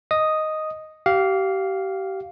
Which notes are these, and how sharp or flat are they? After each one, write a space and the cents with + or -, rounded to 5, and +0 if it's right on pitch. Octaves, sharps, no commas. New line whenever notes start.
D#5 +0 D#6 +0
G4 -30 F5 +0